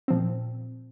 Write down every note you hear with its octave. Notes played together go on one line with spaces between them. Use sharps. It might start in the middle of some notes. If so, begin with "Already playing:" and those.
A#2 F3 C4